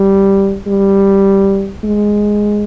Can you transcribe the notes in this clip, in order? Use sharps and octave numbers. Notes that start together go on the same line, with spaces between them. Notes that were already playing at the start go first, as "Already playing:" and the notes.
Already playing: G3
G3
G#3